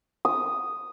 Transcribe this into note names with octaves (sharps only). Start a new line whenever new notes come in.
D#6